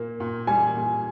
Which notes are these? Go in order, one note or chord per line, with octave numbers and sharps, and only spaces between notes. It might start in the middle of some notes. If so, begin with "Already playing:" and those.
Already playing: A#2 A#3
A#2
G3 G#5
A#2